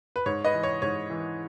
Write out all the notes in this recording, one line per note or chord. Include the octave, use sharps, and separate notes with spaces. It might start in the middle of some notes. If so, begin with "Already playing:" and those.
B4
G#2 C#5
B4 D#5
E3
C#5
G#2 C#5
E3